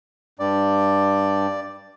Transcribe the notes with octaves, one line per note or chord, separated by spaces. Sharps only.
G2 D5